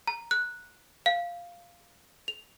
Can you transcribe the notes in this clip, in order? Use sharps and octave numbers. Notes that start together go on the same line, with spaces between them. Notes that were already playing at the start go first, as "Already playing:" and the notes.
A#5
F#6
F5
F7